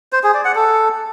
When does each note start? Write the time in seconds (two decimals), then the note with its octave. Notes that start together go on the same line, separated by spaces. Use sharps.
0.13 C5
0.23 G#4
0.34 D5
0.45 F#5
0.56 A4